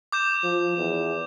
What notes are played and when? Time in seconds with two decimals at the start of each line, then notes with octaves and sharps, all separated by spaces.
0.12 D6 G6 E7
0.43 F3
0.77 E2